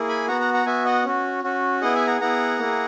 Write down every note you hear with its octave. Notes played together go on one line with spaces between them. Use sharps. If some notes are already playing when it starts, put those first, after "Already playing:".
Already playing: A#3 E4 G#4
G#5 B5
B3 F#4 F#5 A#5
F#5 A#5
F#5 A#5
B3 F#4 E5 G#5
D#5 F#5
C#4 F#4
C#4 F#4
B3 E4 G#4 D#5 F#5
E5 G#5
F#5 A#5
B3 E4 G#4 F#5 A#5
A#3 E4 G#4